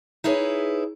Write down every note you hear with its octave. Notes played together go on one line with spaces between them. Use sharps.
D#4 E4 G#4 A#4 B4 C#5